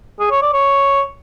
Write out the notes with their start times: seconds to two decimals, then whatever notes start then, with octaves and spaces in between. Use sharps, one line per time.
0.20 G#4
0.31 C#5
0.42 D5
0.53 C#5